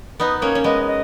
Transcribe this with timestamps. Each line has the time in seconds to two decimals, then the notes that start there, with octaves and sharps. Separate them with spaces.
0.20 B3 D#4 B4
0.42 A#3 C#4 C#5
0.55 C#4
0.64 G#3 B3 D#5
0.87 D#5